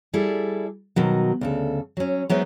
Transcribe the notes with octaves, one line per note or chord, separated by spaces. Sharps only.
G3 E4 G#4 A4
B2 D#3 F#3
D2 C#3 A4
F#3 C#4
F#3 G#3 B3 D#4 C5 E5